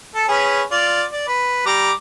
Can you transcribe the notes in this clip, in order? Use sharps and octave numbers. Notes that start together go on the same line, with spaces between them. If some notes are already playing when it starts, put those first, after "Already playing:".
A4
C#4 G#4 B4
F4 D5
D5
B4
G3 A#5 D6